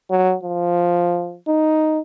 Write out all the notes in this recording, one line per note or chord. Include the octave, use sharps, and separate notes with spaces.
F#3
F3
D#4